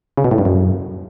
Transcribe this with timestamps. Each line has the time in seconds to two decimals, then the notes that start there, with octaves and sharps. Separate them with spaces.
0.17 C#3
0.24 B2
0.31 A2
0.38 G2
0.45 F#2